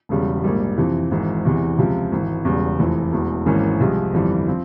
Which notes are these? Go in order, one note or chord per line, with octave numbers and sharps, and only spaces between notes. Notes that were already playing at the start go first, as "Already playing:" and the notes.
E1 E2 C#3 G3
A#1 G#2 G3 A#3
F2 C3 E3
G#1 G#2 E3
E2 C3 E3
C#2 C3 F3
G#1 G#2 E3
E1 E2 C#3 G3
F1 F2 E3
E1 E2 E3
G#1 G#2 E3 A#3 C#4
C2 C3 F3 G#3
G1 F2 E3 G3
F3 C4